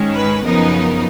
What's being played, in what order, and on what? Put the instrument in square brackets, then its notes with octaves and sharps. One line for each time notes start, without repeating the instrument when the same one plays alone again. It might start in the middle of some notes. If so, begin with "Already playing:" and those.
Already playing: [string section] G#2 D#3 G#3 C#4
B4
F#2 C#3 F3 B3 D#4 A#4